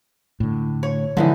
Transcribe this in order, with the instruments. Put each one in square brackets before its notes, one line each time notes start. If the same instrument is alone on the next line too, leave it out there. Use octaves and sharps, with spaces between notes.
[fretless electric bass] A2 D3
[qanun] C#5
[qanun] D3 E3 D#4 [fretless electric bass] F3 G#3